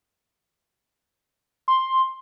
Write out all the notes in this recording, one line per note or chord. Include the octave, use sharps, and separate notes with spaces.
C6